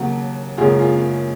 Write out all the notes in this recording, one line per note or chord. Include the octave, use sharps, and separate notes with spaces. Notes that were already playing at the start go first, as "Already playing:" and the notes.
Already playing: D#2 C#3 F#3 A#3 F#4
F#1 F#2 C#3 G#3 F4 G#4
F4 G#4